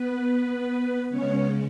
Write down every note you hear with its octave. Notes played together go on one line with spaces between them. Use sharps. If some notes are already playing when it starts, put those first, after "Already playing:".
Already playing: B3 B4
C#3 G#3 B3 C#4 C#5